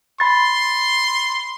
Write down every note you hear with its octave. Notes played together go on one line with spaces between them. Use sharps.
B5 C6 A6